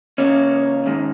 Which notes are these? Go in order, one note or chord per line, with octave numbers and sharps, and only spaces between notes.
C#2 C#3 A#3 C#4
G#2 D#3 G#3